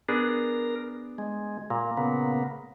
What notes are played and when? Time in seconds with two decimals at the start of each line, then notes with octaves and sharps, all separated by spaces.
0.09 B3 D4 G#4 A#4
1.18 G#3
1.70 A#2 A#3
1.97 C#3 A#3 B3